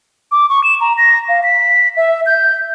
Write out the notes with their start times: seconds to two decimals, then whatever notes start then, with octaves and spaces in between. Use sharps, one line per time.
0.31 D6
0.49 C#6
0.63 E7
0.81 A#5
0.97 A#6
1.29 F5
1.43 B6
1.97 E5
2.26 G6